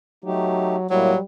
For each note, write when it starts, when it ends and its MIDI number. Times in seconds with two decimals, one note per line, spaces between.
0.24 0.87 54
0.24 0.76 57
0.24 0.76 63
0.24 0.76 67
0.90 1.13 45
0.90 1.17 54
0.90 1.21 55
0.90 1.13 58
0.90 1.13 64